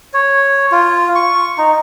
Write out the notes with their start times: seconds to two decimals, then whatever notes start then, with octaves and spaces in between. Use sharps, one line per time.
0.14 C#5
0.72 F4
1.15 C#6
1.58 D#4